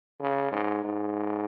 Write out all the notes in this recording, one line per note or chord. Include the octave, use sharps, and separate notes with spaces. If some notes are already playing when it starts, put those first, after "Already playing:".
C#3
G#2
G#2